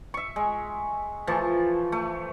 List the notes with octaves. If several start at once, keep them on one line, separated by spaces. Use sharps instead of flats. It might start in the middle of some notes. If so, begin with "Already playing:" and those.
E5 C#6
G#3
E3 F3 A3 A5
A3